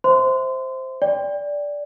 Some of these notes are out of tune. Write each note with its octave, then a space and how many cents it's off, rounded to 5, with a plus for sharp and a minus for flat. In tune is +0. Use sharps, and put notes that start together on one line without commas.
C5 +0 E5 -15 C6 -25
D5 -10 G5 +20